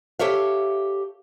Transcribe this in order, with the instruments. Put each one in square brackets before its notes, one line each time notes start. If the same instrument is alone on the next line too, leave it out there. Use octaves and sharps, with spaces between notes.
[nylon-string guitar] G4 A4 C#5 E5 F5